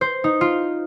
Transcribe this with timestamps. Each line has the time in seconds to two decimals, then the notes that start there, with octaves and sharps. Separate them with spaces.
0.01 C5
0.24 D#4
0.41 F4